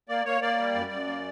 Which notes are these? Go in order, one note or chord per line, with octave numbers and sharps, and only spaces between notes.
A#3 D5
A#3 C#5
A#3 D5
G3
F#2
F#2
A#3